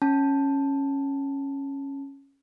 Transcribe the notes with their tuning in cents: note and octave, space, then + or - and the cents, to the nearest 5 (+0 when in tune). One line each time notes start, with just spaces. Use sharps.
C#4 -10 A5 +0